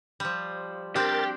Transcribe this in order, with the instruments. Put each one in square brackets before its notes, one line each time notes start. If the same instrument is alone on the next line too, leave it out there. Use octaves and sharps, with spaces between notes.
[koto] F3 G3
[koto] C4 D4 [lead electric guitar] G4 [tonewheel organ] A#4 A6